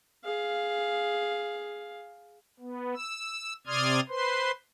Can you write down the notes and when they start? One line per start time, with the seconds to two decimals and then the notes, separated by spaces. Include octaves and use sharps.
0.24 G#4 F5
2.60 B3
2.94 E6
3.67 C3 D5 C6 D#6 F6 G#6
4.09 B4 C5 C6